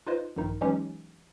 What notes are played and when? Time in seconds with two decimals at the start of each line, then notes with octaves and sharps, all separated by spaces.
0.07 D#4 F4 B4 C5 D#5
0.36 A#1 G2 D#3 D#4
0.61 E3 F#3 G#3 C#4 D#4 G4